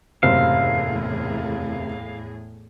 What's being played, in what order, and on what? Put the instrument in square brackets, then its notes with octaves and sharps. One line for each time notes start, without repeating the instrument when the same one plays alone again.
[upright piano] F#1 C3 C5 [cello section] E2 A2 G#4 [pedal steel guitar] F5